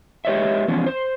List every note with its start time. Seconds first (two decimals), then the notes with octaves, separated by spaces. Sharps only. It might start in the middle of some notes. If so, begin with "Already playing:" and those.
0.25 G#3 G4 B4 C#5 D#5 E5
0.68 E3 F3 B3 C#4
0.86 C5